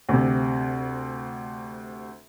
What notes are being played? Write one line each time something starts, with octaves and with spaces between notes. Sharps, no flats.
D2 C3